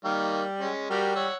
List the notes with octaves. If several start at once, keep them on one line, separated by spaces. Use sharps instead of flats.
D#3 G3 A#3
G#3 C#4
G3 F#4 G4 A#4
C#5 F#5 E6